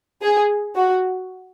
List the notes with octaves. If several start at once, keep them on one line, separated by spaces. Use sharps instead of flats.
G#4
F#4